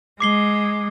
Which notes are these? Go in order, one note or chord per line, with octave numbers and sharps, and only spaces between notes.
G#3 D6 C7 G7